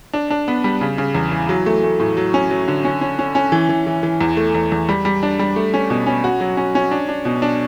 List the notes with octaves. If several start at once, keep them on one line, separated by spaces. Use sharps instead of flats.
D4
D4
B3
G3
C#3
C#3
E2
E3
F#3
A3
A3
A2
F#3
C#4
F#3
D3
C#4
C#4
C#4
C#4
E3
E3
E3
E3
E2
A3
E2
E2
G3
G3
D4
G3
A3
C#4
B2
C#4
F#4
F#3
C#4
C#4
D4
D4
B2
D4